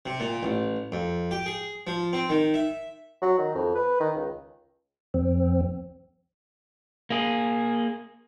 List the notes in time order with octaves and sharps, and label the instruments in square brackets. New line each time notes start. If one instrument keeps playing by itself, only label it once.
[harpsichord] C3
A#2
A1
F2
G4
G#4
F3
C4
D#3
E5
[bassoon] F#3
D#3
F2
B4
D#3
C#2
[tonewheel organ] F2 C4
[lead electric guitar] A#3 G#4